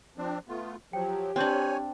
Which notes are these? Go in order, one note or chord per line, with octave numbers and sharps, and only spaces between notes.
F3 C4 D4
A3 B3 F4
F3 F#3 G4 G5
C4 D4 C5 C#5 G#5 G6 F#7